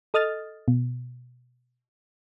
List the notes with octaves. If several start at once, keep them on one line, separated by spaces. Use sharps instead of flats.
A4 D#5 D#6 F6 A6
B2